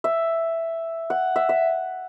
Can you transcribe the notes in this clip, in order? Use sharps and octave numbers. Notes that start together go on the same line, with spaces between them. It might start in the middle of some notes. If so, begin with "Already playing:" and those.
E5
F#5
E5
E5